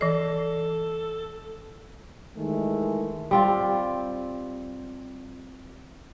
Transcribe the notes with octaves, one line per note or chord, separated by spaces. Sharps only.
E3 A4 D#5
D#3 E3 G#3 A3
G3 C4 F4